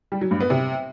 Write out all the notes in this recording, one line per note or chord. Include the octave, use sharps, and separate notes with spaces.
G3
F#3
G2
B3
C3